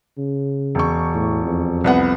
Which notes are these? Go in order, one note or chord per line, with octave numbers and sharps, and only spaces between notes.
C#3
E1 C#6
A2
F2
C2 B3 F#5